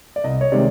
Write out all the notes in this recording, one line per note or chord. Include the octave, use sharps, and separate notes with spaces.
D5
C2 D#5
C#5
C3 D#3 G#3 D5